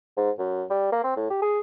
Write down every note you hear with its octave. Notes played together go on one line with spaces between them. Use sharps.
G#2
F#2
G3
A#3
C4
A2
G4
G#4